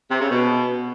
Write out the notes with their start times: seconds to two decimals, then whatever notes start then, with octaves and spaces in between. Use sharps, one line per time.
0.11 C3
0.21 C#3
0.30 B2